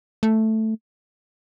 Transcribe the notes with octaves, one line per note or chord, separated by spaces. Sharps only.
A3